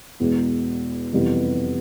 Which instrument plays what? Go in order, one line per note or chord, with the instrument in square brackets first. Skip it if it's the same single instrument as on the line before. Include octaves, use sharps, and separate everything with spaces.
[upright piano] E2 B2 G#3 B3
F2 C3 E3 G3 B3